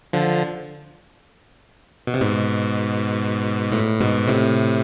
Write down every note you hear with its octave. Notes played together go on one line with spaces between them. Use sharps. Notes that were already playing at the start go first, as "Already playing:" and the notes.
D3 F3
B2
C3
G#2 B2
A2
G#2 B2
A2 C3